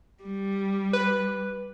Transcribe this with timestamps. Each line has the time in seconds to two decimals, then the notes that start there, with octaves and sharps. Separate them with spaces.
0.23 G3
0.93 B4